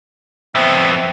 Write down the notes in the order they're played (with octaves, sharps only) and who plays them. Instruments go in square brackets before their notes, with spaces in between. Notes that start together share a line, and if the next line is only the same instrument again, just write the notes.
[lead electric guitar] F2 B3 [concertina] C4 E5